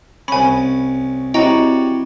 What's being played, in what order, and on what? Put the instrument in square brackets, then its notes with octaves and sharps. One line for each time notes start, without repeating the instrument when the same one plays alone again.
[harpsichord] C2 C#4 [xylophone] G#5 B5
[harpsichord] G3 F#4 C#5 [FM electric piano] C4 E4 [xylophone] D#5 G5 A#5